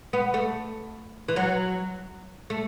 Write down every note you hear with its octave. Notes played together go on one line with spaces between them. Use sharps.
B3
A3
E3
F#3
A3